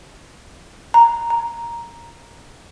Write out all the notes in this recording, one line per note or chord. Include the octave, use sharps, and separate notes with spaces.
A#5
A#5